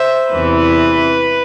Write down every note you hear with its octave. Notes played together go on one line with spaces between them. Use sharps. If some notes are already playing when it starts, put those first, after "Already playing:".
Already playing: C5 E5
E2 C3 E3 B4